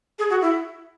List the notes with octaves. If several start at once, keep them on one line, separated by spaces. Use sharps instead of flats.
G#4
F#4
E4